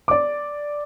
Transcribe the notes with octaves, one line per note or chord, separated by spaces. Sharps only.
D5 D6